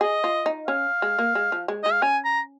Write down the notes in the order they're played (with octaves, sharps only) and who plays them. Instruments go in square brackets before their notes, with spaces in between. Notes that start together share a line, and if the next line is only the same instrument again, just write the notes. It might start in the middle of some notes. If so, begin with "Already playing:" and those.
[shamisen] G#4 [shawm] D#5
[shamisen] F4
D#4
[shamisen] C#4 [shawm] F5
[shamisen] G#3
A#3
G#3
F3
G#3
[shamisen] G#3 [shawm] D#5
[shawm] F5
[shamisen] C#4 [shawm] G#5
[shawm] A#5